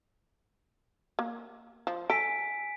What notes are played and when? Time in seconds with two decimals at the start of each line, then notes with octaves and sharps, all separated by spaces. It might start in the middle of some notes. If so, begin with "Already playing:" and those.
1.19 A#3
1.87 F3
2.10 A4 G#5 B6 D7